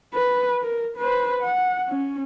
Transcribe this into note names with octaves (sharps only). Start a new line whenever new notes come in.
B4
A#4
B4 C5
F#5
C#4